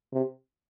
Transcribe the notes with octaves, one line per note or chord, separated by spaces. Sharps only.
C3